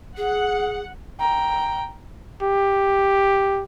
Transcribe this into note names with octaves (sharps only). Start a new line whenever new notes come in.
G#4 F#5
G5 A#5
G4